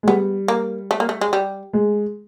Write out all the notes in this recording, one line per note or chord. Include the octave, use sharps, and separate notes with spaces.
G#3
G3 B3
A#3
A3
A#3
A3
G#3
G3
G#3